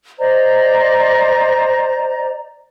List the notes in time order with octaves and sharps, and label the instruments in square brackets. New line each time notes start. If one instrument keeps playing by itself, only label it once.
[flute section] C5 D5 D#5 A#5